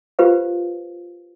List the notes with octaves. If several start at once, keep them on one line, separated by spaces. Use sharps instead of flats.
F4 G4 B4 C5 F5